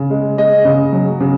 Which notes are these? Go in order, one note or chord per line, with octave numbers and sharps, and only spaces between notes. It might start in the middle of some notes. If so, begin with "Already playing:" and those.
Already playing: C#3
G#3
G#3 D#5
C#3
F#3
C#3